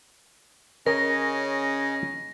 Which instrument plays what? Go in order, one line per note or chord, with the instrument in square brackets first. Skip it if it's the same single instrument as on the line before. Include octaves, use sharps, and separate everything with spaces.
[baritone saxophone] C#3 [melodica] C#4 D#5 [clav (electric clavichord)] A#4 [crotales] A#6